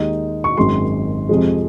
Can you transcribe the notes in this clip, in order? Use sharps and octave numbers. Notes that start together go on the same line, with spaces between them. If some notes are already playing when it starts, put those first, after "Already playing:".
Already playing: D#2 D#3 G#3 D#4
C#6
G#1 F#2 D#3 G#3 C6
F2 C3 F3 G#3